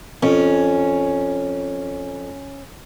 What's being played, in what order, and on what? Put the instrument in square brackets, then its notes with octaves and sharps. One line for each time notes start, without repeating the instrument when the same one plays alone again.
[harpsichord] F2 [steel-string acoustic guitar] C#4